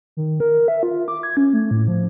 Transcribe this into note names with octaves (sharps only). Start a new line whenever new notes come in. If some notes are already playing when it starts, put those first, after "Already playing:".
D#3
A#4
E5
F4
D6
G#6
C#4
A3
A2
F3